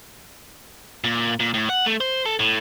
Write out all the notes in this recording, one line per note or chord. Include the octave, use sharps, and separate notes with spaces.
A#2
A#2
A2
F#5
A3
C5
A4
A2